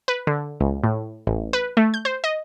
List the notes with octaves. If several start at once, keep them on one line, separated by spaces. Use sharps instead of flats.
B4
D3
C#2
A2
A1
B4
A3
G6
C5
D#5